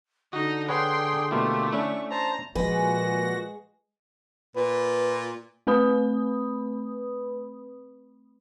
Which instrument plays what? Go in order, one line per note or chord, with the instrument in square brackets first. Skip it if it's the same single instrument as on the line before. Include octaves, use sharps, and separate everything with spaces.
[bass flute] D3 [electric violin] D#4 D#5 [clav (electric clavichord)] F#4
[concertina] G#4 [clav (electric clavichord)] B4 C#5 F#5 [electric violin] G5 C6
[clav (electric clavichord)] B2 A#3 E4 [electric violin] A3 [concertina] F4 G4
[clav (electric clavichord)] C#4 D4 E4 [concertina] C#6
[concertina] C5 A5 [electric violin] A#5
[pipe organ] A#2 F#4 A#6 [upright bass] F3 [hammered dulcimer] G#3 G#4 [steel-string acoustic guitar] B4
[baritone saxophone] A#2 [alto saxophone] B4
[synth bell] A3 C4 B4 B5 D#6